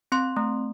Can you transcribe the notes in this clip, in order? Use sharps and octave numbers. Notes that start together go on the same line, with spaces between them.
C4 C6
A3